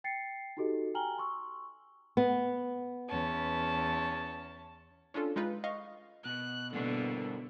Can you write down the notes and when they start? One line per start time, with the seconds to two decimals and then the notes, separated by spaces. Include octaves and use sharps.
0.04 G5 A6 C7 C#7
0.57 D#4 F#4 G4 A4 D#5
0.94 G5 G#5 A#5 F6 F#7 G7
1.18 C6 C#6 E6
2.17 B3
3.07 E2 C#4 A5
5.14 C#4 D4 F4 A4
5.36 G#3 D#4 F4 B4
5.64 D#5 F5 C#6
6.26 B2 F#6
6.73 G2 B2 D3 A#3